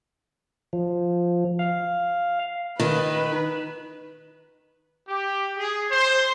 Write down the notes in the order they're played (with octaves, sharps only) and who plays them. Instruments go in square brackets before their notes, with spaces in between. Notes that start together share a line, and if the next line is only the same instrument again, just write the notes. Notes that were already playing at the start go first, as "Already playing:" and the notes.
[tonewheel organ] F3
F5
[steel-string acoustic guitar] D#3 [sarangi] B4
[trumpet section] G4
G#4
C5